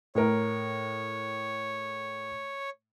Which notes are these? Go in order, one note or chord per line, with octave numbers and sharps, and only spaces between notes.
A2 A#4 C#5